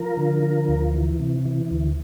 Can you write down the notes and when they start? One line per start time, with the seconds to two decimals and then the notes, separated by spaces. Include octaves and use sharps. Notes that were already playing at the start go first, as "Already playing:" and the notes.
Already playing: F3 A#4
0.17 D3
0.43 F3
0.68 D2
0.94 E3
1.20 C3
1.45 E3
1.71 D2